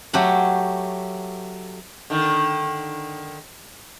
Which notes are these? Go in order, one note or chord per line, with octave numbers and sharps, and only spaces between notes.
F#3 A3 G4 F#5
D3 D#3